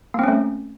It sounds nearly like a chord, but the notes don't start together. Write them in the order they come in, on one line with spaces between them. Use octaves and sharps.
A#3 C4 C#4 A3